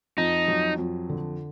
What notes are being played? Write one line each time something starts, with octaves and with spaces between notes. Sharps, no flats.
F2 D#4
F#3
F2
D3